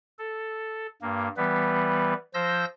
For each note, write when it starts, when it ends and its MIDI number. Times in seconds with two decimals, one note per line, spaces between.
0.19 0.87 69
1.02 1.29 43
1.02 1.29 58
1.37 2.14 52
1.37 2.14 55
1.37 2.14 59
1.37 2.14 71
2.34 2.65 53
2.34 2.65 72
2.34 2.65 88
2.34 2.65 91
2.34 2.65 94